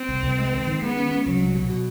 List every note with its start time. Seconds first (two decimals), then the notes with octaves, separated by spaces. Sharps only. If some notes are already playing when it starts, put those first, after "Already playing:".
Already playing: C4
0.09 C2
0.23 C2
0.38 G#3
0.53 D#3
0.67 D#3
0.82 G#3 B3
0.97 C#4
1.11 C#4
1.25 C2 F#3
1.40 C2
1.55 B2
1.69 B2